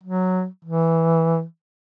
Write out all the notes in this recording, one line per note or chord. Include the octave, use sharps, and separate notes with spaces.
F#3
E3